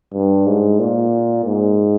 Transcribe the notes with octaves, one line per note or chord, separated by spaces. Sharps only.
G2
G#2
A#2
G#2